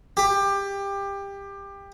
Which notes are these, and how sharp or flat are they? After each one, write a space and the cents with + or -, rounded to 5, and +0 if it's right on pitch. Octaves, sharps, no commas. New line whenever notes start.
G4 +20